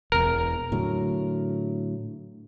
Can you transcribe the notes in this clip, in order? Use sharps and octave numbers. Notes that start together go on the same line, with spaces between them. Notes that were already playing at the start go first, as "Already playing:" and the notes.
E1 E2 A#4
A2 D3 F#3